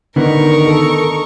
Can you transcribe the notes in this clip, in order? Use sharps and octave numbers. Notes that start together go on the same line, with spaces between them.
D3 D#3 B3 D#4 A#4 C#6
A4